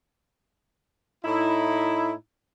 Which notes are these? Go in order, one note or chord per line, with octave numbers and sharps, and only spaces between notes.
A2 D#4 E4